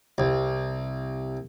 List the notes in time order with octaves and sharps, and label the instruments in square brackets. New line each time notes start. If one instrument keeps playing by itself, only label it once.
[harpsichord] C2